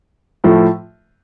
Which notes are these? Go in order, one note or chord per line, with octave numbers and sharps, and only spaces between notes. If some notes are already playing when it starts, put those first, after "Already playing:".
A2 F3 A3